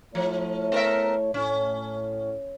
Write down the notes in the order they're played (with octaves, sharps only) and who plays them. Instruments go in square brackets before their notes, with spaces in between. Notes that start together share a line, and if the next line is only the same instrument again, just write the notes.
[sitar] F3 [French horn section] A3 E4 C#5
[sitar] B3 A#4 E5
[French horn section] A2 [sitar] C#4